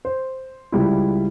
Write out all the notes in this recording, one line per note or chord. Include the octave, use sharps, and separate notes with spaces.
C5
C#2 G3 E4